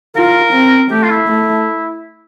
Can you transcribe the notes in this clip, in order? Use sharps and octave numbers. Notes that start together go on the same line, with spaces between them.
F4 A#4
C4
A3 G4
F4
E4
A3